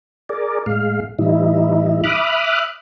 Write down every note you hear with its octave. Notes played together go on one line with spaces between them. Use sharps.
G#4 A#4 D5
A2 G#3 F5
A2 E3 G3 D#4 E4
E5 B5 D6 D#6 F6 F#6